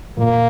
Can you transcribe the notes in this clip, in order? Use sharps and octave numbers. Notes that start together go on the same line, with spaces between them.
A#2 A#3